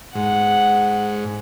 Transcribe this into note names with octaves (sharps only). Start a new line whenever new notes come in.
G#2 F#5